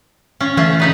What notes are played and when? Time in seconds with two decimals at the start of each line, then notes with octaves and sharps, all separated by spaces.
0.40 C#4 F4
0.57 E3 A3 C#4 F4
0.80 C#3 D#4 B4